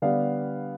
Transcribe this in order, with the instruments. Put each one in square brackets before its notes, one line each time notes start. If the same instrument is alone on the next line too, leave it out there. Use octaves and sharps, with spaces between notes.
[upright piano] D3 G3 B3 D4 F5